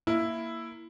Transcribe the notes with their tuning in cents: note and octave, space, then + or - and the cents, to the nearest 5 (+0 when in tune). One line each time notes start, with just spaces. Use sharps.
A#3 +0 E4 +5 A#4 +0